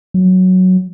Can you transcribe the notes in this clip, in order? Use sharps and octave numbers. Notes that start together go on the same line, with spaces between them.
F#3